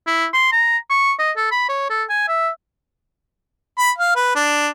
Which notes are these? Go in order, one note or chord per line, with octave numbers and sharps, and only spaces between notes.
E4
C6
A#5
C#6
D#5
A4
B5
C#5
A4
G#5
E5
B5
F5
B4
D4